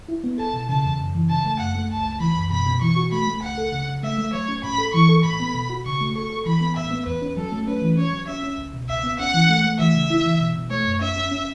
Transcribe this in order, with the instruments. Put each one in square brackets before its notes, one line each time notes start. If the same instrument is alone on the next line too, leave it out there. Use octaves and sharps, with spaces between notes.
[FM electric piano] E4
B3
[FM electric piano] A4 [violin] A5
[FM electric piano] B2
[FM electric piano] C#3 [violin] A5
[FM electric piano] E2
F#2
E3
[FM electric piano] C#3 [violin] A5
[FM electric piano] A3
[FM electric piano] F#2 [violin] F#5
[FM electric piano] A3
[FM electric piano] C#2 [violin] A5
[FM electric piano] C#2
[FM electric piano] E3 [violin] B5
[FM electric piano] F#2
[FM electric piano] B2 [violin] B5
[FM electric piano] B2
[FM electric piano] E3 [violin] C#6
[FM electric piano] F#4
[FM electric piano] A3 [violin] B5
[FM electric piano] A3
[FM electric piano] C#2 [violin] F#5
[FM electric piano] A4
C#3
C#3
[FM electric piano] A3 [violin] E5
[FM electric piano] A3
[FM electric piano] F#3 [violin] C#5
[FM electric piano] C#4
[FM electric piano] A2 [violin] B5
[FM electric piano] A4
[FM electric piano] E3 [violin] C#6
[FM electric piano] A4
[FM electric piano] A2 [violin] B5
[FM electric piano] B3
B2
F#4
[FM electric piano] C#3 [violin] C#6
[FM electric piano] A3
[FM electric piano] A4 [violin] C#6
[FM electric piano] A4
[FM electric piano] E3 [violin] B5
[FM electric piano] B3
[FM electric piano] A2 [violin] E5
[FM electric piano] B3
[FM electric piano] E2 [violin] B4
[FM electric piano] C#4
[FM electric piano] F#3 [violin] A4
[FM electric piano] A3
[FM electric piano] C#4 [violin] B4
[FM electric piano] E3
[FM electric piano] C#4 [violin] C#5
[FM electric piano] F#3
[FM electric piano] C#4 [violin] E5
[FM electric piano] C#4
C#2
B2
[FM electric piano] C#2 [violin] E5
[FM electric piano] B3
[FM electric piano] C#4 [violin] F#5
[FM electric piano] E3
A3
A3
[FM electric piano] E3 [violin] E5
[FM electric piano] C#3
E4
E3
B2
B2
[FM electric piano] A3 [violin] C#5
[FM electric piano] F#2
[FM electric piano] C#4 [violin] E5
[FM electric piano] C#4
C#4